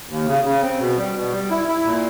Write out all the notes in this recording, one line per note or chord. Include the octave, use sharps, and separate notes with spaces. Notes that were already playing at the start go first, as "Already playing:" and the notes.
D#2
C#3
C#3
C4
B2
G3
B2
G3
E4
E4
A#2